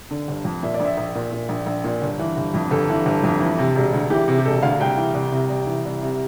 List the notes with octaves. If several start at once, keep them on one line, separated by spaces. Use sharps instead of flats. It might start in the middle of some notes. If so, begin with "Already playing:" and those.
D3
G1
F2
A#2 E5
D5
A#1 E5
A#1
A#2
A#2
A#1
A#1
A#2
G1
E3
G1
F2
G1 A4
E3
G1
F2
E3
C3
E1
D2
E3 G4
C3
G4
E1 A4
D2 F5
C2 G5
E3
C2
C3
C2
E3
C2
C3